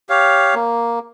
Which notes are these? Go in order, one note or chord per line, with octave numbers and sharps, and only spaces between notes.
G4 C#5 F5
A#3